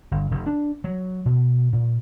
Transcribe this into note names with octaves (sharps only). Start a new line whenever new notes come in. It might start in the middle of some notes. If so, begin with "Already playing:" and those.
G1
F1
D4
F#3
B2
A#2